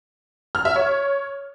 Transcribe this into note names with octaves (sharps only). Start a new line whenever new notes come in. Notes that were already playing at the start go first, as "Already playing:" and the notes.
F6
E5
C#5